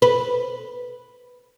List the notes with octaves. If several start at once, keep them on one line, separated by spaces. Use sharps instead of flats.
B4